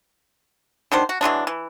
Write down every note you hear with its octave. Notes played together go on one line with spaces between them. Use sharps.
D#3 F#3 D4 C5
F#4
E3 F#3 G#3 D4
E3